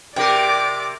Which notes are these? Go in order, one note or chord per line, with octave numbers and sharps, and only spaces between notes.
C3 G4 A#4 D5 G5 D6